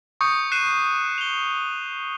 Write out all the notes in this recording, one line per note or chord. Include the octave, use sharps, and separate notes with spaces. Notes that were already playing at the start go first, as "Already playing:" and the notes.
C#6 D#6 G6 C#7
F#6 C7 D#7 E7
F7 G7